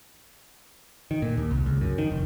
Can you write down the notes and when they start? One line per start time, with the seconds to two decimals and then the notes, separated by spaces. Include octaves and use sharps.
1.11 D#3
1.22 A#2
1.37 D#2
1.51 C2
1.66 C#2
1.81 F#2
1.98 D#3
2.12 F1